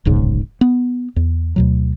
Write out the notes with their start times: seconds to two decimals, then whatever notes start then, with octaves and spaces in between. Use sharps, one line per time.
0.05 D1 B1 G#2 C#3
0.61 B3
1.16 E2
1.56 D2 B2 F#3